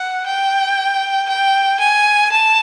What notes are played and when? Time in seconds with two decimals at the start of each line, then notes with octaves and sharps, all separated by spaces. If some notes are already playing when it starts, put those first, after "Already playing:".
Already playing: F#5
0.26 G5
1.29 G5
1.79 G#5
2.31 A5